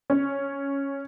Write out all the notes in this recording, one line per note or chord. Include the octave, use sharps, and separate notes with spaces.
C#4